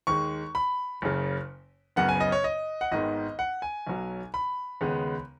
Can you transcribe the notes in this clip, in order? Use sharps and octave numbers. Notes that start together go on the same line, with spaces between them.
D#2 D#3 G#3 C#6
B5
F#1 F#2 C#3
F#1 F#2 C#3 B3 F#5
G#5
D#5
C#5
D#5
F#5
G#1 G#2 D#3 G#3 B3 D#5
F#5
G#5
B1 B2 F#3
B5
D#2 C#3 G#3 B3